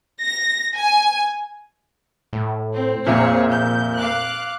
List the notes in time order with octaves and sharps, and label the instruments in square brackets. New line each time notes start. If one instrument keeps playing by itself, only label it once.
[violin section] A#6
G#5
[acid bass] A2
[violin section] C4
[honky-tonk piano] F1 A#2 E5 [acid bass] A#3 [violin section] C4 G#4 C#5
[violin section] G6
F5 D6 F#6